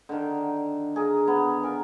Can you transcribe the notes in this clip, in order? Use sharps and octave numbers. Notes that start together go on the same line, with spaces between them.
D3 D#3
G#4 A#4
B3
A#4 G#5